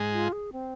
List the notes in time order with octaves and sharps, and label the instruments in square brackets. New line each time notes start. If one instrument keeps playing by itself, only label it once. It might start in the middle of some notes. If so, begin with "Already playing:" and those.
Already playing: [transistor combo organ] G#2 G#3
[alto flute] F4
G#4
C4